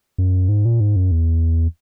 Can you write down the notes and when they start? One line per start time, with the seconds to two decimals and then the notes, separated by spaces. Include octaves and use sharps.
0.18 F#2
0.49 G#2
0.65 A#2
0.80 G#2
0.96 F#2
1.11 E2